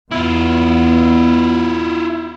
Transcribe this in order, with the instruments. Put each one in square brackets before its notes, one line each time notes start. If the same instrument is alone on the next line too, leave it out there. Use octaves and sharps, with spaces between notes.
[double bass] E2 B3 [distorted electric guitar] E4 F4